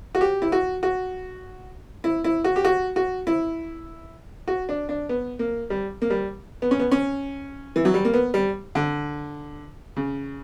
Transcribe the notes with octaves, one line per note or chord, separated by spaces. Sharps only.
F#4
G4
E4
F#4
F#4
E4
E4
F#4
G4
F#4
F#4
E4
F#4
D4
D4
B3
A#3
G3
A#3
G3
B3
C#4
B3
C#4
E3
F#3
G3
A#3
B3
G3
D3
C#3